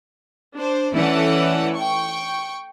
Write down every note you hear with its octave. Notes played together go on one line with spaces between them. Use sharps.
D4 C5
E3 A3 C#4 A4 D5 F#5
G5 C#6